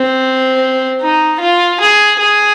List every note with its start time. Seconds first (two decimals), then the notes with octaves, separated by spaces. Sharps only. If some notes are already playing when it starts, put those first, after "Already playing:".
Already playing: C4
1.01 D#4
1.41 F4
1.80 G#4
2.19 G#4